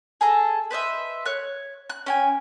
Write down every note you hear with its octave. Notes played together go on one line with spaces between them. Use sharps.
G#4 A4 A#5
B4 C5 D#5 E5
C#5 F#6
F#6
C#4 G5 G#5